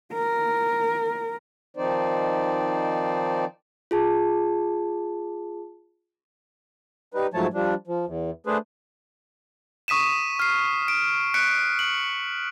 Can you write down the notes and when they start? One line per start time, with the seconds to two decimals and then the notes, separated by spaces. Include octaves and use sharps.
0.14 A#4
1.77 D#3 F3 C4 D#4 C5 D5
3.91 F4 G#4 A5
7.14 G3 D#4 B4
7.34 G#2 F3 F#3 A3 C#5 A5
7.54 F3 G3 D4
7.87 F3
8.06 E2
8.47 A3 D4 G#4 B4 C5
9.88 C#6 D#6 B6 D#7 E7
10.39 F6 C7
10.88 D7
11.34 F#6 B6 C#7 D7
11.79 F#7